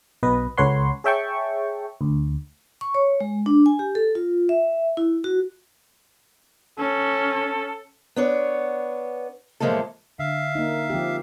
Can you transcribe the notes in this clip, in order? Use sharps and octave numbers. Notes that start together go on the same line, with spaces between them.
B1 B2 B3 B4 D#5
C#2 A4 B4 C#5 F#5 C6
G#4 C#5 E5 G5 A5 C#6
D2
C#6
C#5
G#3
D4
G#5
G4
A4
F4
E5
E4
F#4
C#4 A4
B3 D4 C#5
A2 E3 F3 G#3 A#3 A4
D3 E5 F5
A#3 D#4
F3 C4 G4